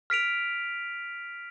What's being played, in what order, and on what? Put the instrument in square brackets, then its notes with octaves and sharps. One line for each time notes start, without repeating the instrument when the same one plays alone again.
[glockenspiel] F6 B6 D7 F7